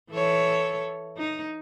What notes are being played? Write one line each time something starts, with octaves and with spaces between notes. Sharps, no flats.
E3 A4 C#5
D#4